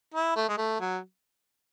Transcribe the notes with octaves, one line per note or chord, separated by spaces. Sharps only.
E4
A3
G#3
A3
F#3